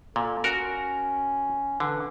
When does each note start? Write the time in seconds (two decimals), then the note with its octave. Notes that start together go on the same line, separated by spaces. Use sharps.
0.16 A#2 A4
0.44 C#4 F#4 A#4
1.80 D3 E3